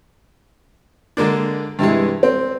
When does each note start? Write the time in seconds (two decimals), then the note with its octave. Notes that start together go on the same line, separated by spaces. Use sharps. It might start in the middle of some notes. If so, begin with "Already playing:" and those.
1.17 D3 G#3 A#3 D4
1.79 G2 C3 E3 G#3
2.23 C4